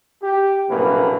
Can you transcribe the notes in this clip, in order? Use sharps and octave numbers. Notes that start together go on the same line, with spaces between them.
G4
A#1 F#2 A2 C3 A#3 B4